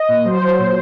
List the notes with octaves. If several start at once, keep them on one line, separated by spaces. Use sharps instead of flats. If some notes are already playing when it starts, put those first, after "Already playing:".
Already playing: D#5
A#2
F#3 C5
F#3
A#2